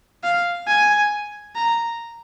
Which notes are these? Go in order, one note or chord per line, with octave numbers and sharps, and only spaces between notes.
F5
G#5
A#5